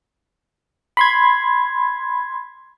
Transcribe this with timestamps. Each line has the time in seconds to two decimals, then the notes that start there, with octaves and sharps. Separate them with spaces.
0.97 B5 C6 G#6